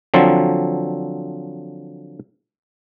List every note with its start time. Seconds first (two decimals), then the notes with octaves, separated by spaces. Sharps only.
0.14 D3 F3 F#3 C4